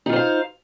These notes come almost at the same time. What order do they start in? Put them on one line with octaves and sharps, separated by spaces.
D#4 F4 C5 F5